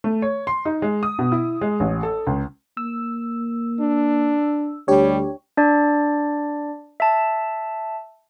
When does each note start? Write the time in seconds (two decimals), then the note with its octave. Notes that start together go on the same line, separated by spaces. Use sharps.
0.04 A3
0.22 C#5
0.47 C6
0.65 D#4
0.82 G#3
1.03 D#6
1.19 B2
1.32 E4
1.61 G#3
1.80 A1
2.03 A4
2.27 C#2
2.77 A#3 E6
3.80 D4
4.88 D2 G3 D4 G4 C#5
5.57 D4 D5
7.00 E5 A5